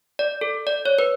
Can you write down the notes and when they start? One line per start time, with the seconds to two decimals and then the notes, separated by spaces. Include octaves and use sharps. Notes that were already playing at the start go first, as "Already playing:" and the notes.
0.19 D5
0.41 A4
0.67 D5
0.86 C#5
0.99 B4